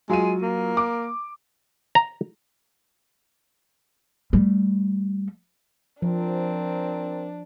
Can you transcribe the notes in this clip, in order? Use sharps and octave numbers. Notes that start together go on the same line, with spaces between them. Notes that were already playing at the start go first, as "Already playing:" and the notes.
F#3 G#3 F4 D#7
A#3
D6
A#5
G3 A3
F3 C4 D4 A#4